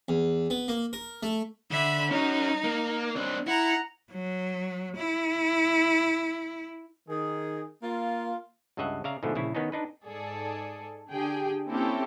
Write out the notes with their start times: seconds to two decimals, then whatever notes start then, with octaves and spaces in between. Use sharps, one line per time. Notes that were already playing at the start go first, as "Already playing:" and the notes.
0.09 E2
0.50 B3
0.68 A#3
0.93 A#4
1.23 A3
1.71 D3 E5 B5
2.11 F#3 C#4 D#4
2.64 A#3
3.16 C4 D4
3.47 E4 F#5 A#5
4.11 F#3
4.96 E4
7.09 D#3 G#4
7.83 A#3 F4
8.77 C#2 G2 C#3 D#5 E5 F#5
9.04 C#3 D5 E5 F5 A#5
9.23 G#2 B2 D3 F3 A3
9.35 A#1 C#3 E4
9.55 D#3 B3 C#4 D#4
9.72 D4 D#4 B4
10.06 G#2 G#4 A4 D5
11.10 D3 G4 G#4 G5
11.67 A#3 C4 C#4 E4 G4 A4